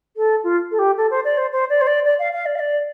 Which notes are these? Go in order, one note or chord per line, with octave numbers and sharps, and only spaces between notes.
A4
F4
A4
G4
A4
C5
D5
C5
C5
D5
C5
D5
D5
F5
F5
D5
F5
D5